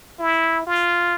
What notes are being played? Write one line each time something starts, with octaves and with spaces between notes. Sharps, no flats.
E4
F4